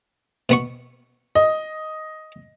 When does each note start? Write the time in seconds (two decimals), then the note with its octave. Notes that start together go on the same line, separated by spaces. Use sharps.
0.49 B2 B3 C#6
1.35 D#5